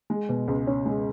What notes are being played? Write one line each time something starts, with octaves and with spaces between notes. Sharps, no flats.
G#3
B2
C#2
C#4
G#3